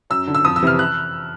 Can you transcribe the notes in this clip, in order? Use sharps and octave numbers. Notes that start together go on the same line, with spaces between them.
F#2 E6
D3
E6
F2 D#6
E6
C3 E3 F6
F#6